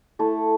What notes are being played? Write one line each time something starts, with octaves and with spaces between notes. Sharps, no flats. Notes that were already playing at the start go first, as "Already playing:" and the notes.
A3 E4 A4